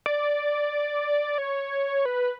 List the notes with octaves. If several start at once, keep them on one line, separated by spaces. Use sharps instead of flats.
D5
C#5
B4